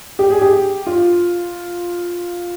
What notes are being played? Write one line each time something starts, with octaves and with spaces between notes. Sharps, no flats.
G4
G#4
G4
F4